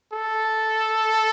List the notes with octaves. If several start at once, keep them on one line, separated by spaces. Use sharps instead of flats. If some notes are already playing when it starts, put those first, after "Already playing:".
A4